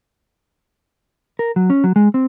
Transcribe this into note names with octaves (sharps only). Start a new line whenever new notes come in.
A#4
F#3
C#4
F#3
G#3
C4